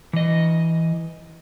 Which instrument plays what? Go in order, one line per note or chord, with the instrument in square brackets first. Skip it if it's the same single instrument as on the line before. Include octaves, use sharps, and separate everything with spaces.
[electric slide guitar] E3 D#5